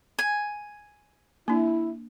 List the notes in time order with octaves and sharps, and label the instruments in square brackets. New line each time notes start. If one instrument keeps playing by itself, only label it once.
[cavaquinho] G#5
[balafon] A#3 D4 [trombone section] E4